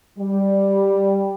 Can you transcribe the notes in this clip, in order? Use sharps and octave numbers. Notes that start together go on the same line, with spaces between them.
G3